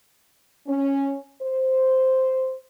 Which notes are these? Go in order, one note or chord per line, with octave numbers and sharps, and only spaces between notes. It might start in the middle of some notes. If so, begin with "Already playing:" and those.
C#4
C5